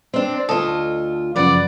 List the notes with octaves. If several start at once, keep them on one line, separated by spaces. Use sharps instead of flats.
C4 D4
D2 F4 A4 D#5
F#2 C#3 F3 B4 D5 F#5